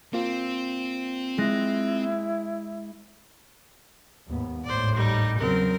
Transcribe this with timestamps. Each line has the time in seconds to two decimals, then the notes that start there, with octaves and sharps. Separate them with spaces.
0.13 A#3 C4 F4
1.38 G#3 E4 F#6 A#6
4.27 D#2 G#2 B3
4.64 G#1 D#2 A2 C5 D5
4.96 G3 D#4
5.38 E2 C#3 F#3 C4 A#4